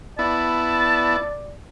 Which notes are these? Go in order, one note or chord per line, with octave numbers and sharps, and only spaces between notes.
B3 E4 D5 A5